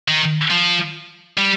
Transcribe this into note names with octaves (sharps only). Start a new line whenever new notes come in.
D#3
F3
G3